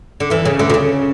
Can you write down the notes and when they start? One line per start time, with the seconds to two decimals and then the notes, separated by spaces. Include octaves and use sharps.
0.20 D3
0.30 E2 E3
0.45 C#3
0.59 D2 D3
0.70 B2
0.74 C#3